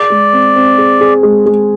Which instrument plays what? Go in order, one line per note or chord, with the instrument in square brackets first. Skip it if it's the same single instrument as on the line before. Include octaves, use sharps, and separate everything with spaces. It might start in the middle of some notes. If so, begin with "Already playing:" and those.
Already playing: [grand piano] G#4 [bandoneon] D5
[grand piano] G#3
C4
C4
G#4
G#4
G#3
G#3